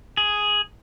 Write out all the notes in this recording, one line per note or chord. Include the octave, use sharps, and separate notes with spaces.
G#4